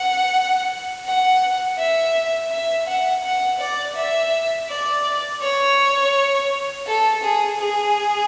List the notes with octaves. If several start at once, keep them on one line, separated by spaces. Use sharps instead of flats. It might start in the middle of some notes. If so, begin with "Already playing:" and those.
Already playing: F#5
F#5
E5
E5
F#5
F#5
D5
E5
D5
C#5
A4
G#4
G#4